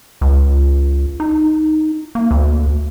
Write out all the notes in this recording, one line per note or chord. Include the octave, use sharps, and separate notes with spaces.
C#2
D#4
A#3
D2